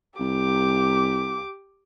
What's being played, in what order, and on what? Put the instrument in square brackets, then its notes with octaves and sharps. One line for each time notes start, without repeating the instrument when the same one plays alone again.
[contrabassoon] C2 [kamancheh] G4 D6